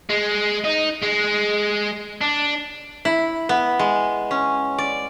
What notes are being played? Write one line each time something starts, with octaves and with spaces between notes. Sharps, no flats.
G#3
D#4
G#3
D4
E4
B3
G#3
C#4
D5